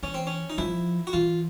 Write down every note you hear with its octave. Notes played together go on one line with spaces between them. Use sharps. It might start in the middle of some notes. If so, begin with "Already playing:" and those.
E3 C#4
C4
C#4
D#4
F3 E4
F#4
E3 F4